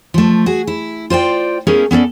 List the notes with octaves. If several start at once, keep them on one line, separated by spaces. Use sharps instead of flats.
F3 A3
F#4 G#4
E4
F4 C5 D5 G5
A3 B3 C#4 E4 G#4 A#4
B3 C#4 A4 D5